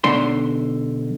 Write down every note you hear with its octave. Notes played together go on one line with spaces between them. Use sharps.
B1 D3 C6